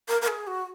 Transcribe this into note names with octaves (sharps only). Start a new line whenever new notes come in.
A#4
A#4
G#4
F#4